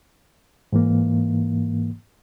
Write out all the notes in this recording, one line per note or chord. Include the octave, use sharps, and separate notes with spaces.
G#2 E3 A#3